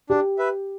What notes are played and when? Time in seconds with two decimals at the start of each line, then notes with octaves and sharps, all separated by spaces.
0.10 D4 G4
0.38 B4 E5